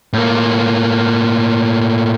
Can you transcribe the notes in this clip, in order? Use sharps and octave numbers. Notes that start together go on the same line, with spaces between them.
A2 A#3